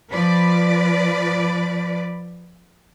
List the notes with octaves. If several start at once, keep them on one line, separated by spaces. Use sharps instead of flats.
F3 B4 D5